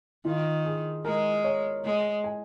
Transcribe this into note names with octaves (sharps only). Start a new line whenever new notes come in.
D#3 F4
G#4
G#3 A#4
C#5
G#3
G#5